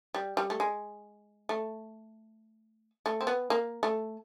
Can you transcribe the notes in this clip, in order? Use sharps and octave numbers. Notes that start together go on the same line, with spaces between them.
G3
G3
A3
G#3
A3
A3
C4
B3
A#3
A3